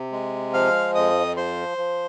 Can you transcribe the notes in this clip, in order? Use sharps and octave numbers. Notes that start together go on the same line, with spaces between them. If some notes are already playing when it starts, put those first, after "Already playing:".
Already playing: C3
G#3
F3 F5 F6
F2 D#5 D#6
F3 C5 C6
F3